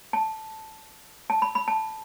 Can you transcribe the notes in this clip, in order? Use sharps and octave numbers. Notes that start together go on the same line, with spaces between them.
A5
A5
B5
B5
A5